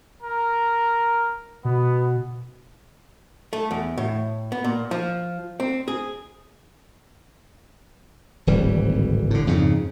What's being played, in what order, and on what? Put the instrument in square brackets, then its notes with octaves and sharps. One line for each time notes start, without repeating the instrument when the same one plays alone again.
[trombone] A#4
[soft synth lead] B2 [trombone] B3
[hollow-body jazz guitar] A3
E2
A2
B3
A#2
F3
C4
G#4
[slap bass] D1 G#1 E3 G3
A2 D3
F2 G#2 C#3